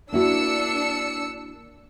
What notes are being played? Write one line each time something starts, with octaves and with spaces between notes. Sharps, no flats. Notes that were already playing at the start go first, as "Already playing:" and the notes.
A#3 D4 E4 F#4 E6 C#7